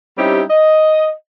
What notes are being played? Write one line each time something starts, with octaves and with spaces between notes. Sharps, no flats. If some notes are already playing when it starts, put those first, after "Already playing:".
G3 C4 C#4 D#4 E4 G4
D#5